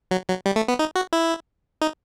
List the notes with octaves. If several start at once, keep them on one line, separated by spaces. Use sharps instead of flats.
F#3
F#3
G3
A3
B3
D#4
F#4
E4
D#4